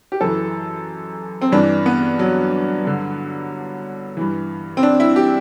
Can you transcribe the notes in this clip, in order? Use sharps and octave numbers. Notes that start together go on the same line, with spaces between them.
G4
F#2 E3 A4
C4
G2 E3 D4
B3
F#3
G2 D3
G2 E3
C4
D4
E4
G4